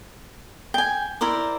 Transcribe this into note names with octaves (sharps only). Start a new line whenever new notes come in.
G5 G#5
E4 A#4 C5 D5